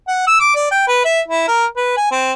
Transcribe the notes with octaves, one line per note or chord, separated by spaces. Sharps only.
F#5
E6
D6
D5
G5
B4
E5
E4
A#4
B4
G#5
C4